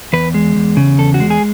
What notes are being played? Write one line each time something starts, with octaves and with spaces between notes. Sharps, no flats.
E2 B4
G#3
E2
C#3
E2 A4
F#4
G#3
G#4